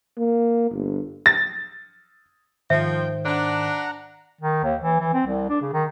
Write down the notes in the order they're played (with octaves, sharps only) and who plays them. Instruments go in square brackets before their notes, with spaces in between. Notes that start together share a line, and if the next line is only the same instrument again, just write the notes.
[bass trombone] A#3
G1
[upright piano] A6
[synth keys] G#2 D#3 C5 [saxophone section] F3 [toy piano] E5 [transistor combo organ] G5
[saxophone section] D4 [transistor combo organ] F#5 A#5
[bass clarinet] D#3
D#2
E3
E3
C4
C2
D4
C#3
D#3